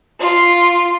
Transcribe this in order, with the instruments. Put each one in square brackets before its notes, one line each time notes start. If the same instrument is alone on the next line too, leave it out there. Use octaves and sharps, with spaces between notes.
[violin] F4